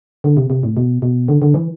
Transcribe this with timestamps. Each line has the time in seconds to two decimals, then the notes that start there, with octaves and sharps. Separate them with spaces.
0.24 D3
0.37 C3
0.50 C3
0.63 A2
0.77 B2
1.02 B2
1.28 D3
1.42 D3
1.54 E3